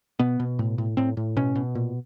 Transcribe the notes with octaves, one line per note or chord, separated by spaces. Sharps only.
B2 B3
B2
A2
A2
A2 C4
A2
B2 C#4
B2
A#2